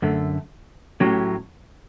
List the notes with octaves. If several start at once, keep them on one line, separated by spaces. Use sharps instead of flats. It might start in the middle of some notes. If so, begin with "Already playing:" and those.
F#2 D3 A3
A2 F#3 C#4 G4